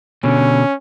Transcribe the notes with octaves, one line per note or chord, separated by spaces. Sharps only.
B2 D3 C#4